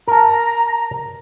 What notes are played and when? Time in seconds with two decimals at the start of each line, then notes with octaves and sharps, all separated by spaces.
0.08 A#4 A5 A#5